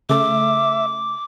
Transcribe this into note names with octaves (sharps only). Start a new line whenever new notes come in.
C#3 A3 E5 D6